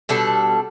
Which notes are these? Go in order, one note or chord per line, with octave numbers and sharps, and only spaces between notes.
B2 G3 D4 A4